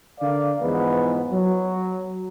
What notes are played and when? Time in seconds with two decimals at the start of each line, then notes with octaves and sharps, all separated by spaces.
0.20 D3 A#4 D5 F5
0.60 E2 G#2 E3 F3 B3
1.31 F#3